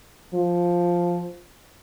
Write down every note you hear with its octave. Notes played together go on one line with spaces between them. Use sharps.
F3